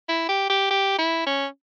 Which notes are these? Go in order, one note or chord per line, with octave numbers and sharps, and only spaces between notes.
E4
G4
G4
G4
E4
C#4